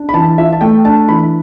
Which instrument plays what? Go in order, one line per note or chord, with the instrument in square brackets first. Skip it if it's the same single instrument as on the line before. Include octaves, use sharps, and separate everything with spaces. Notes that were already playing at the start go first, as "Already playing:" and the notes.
Already playing: [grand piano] D4
B5
E3 A5
F4 E5
A5
A3 G5
D4 A5
E3 B5